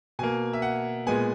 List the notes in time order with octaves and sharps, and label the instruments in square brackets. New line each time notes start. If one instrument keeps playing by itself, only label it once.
[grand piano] B2 A#3 G#5
E5
F#5
A#2 G#3 B3 G#5